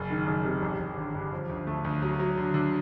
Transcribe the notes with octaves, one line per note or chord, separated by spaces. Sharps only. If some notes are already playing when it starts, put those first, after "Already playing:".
Already playing: F#1
D#3
F#1
C3
A1
A1
D3
G2
F3
D2
A3
D2
F#3
F#3
D3
D3